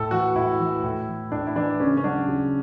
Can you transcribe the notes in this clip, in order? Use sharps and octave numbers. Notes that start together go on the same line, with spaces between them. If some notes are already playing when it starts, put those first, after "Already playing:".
Already playing: A2 A4
E3 F#4
A2 E4
E3
A2
E3
A2 D4
E4
E3 D4
C#3 C#4
C#4
F#3 D4
C#3